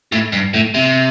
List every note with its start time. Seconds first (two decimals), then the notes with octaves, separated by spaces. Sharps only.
0.12 A2
0.32 G2
0.54 A2
0.74 C3